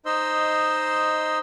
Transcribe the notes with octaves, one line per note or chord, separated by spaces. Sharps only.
D#4 C5 D#5 C6 E6